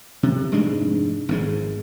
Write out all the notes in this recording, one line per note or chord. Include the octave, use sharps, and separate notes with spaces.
C3
F1 G#2 G#3 D4
G#1 G#2 G#3